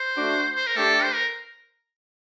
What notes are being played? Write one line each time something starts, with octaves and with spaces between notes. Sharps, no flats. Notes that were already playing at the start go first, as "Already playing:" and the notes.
Already playing: C5
A3 D4 F#4
C5
A#4
A3 D4 G4 A4
C5
A#4